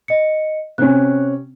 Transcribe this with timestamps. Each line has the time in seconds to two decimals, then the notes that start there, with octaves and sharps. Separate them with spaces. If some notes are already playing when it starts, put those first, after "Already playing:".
0.08 D#5 C#7
0.78 C3 C#4 F#6